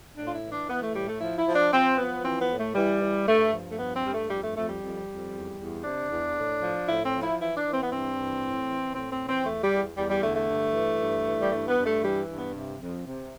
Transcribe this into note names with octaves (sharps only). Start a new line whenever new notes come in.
A2 D4
F4
E4
E3
D4
E3 B3
A3
A2 G3
A3
F3 E4
E4
F3
D4
F3 C4
F3 B3
E3 C4
B3
A2
A3
E3 G3
E3
G2 A3
F3
A3
G2 B3
C4
G2 G3
A3
F2 G3
A3
F2 A3
G3
F2
F2
E2
E2
C3 D4
E2
A2
F3
A2 E4
C4
F3
E4
E3 E4
D4
E3
C4
B3
G2 C4
E3
A2
E3
A2 C4
C4
E3
C4
E2 A3
G3
E2
E2 G3
G3
D3 A3
A3
G2
E3
G2
E3
G3
G2 A3
B3
G2
A3
E3 G3
G2
B3
C3
F2
C3